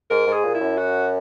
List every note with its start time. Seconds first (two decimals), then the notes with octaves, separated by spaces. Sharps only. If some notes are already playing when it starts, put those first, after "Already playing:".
0.10 G#2 A#4
0.27 G#2
0.33 G#4
0.44 A#2
0.55 E4
0.61 F#2
0.77 F#4